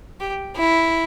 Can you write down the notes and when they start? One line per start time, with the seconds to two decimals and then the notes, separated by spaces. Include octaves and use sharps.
0.20 G4
0.57 E4